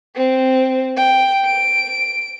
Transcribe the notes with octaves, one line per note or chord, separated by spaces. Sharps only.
C4
G5
D7